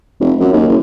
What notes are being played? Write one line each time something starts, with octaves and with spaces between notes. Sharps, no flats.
F1
F#2
D#2
F#1